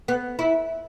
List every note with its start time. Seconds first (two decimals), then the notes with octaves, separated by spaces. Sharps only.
0.08 B3
0.39 E4